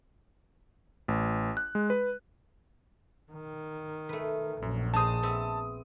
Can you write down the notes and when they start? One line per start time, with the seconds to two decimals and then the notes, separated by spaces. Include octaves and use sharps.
1.08 A1
1.57 F#6
1.75 G#3
1.90 B4
3.32 D#3
4.09 A3 B4
4.62 A#1 F#2
4.94 D#4 G#4 C5 A5 D#6
5.23 B3 C4 E5